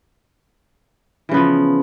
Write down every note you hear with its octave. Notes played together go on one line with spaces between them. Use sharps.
C#3 E3 F3 B3